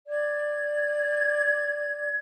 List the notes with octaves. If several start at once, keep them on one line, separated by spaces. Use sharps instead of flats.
D5 G#6